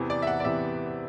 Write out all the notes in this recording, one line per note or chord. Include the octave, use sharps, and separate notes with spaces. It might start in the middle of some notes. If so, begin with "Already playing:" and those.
Already playing: E2 C3 E3 B3
D5
E5
F#5
D5
C3 E3 B3 E5